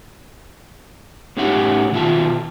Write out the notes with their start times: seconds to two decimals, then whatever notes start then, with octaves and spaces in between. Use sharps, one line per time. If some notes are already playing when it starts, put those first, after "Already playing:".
1.37 A2 C#4 D#4 G4 E5 F#5
1.92 B2 D#3 F4 F#4 E5 A5